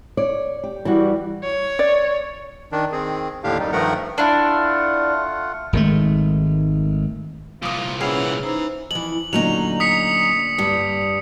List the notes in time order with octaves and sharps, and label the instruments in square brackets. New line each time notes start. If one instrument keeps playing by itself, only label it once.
[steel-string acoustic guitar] C#5 [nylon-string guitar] D5
[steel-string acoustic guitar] G4
[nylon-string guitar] E3 F#4 [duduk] G3
[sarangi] C#5
[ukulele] D5
[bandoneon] D#3 D4
D#3 C4 G#4
D#2 A2 D3 D4 G4 F5
F#2 G3 D#4
G2 D#3 F3 A3 A#4 F#5
[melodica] A3 F4 F#5 [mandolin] D4 E4
[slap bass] G#1 D#3 G#3 A3
[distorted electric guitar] C2 A#2 [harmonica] F4 [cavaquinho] D6 D#6
[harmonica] E3 F#5 F6 [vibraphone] C#4 C#5 [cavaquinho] G#4
[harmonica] E3 [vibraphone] D#4 C5 A#5
[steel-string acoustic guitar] F2 E3 [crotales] F#7
[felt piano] A#2 D3 A3 [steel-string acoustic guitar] F#3 C#4 D#4 [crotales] F7
[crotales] D#6 B6 C#7
[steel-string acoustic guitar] G2 G3